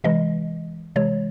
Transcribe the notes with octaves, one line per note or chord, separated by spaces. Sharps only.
C3 E3 G#3 D#5
C3 E3 G#3 C#5